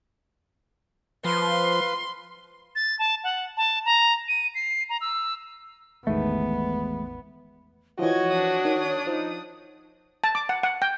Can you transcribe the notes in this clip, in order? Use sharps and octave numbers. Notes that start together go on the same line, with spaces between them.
F3 B4 F5 C6
A6
A5
F#5
A5
A#5
D#7
C7
A#5
E6
A1 E2 D#3 E3 G#3 A3 B3
E3 F3 F#4 C#5 D#5 G#6
D4 D#6
D#3
F3 D#4
A5
D6
F#5
F#5
G5